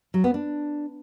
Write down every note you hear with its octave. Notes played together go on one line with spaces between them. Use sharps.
F#3
B3
D4